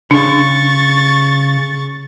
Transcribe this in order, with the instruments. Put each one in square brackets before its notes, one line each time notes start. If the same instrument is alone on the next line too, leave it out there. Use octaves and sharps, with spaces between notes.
[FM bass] C#3 [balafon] D4 [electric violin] C#6 A6